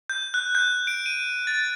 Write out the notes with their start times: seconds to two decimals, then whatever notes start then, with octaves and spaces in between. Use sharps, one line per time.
0.10 G6
0.34 F#6
0.55 G6
0.87 D7
1.06 D#7
1.47 A6